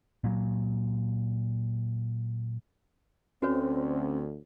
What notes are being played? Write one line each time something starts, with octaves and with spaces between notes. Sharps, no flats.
A#2 F#3
D2 C4 C#4 F#4 B4 C#5